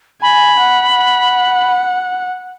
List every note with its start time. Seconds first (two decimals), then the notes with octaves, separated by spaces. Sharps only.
0.22 G#5 B5
0.60 F#5
0.96 F#5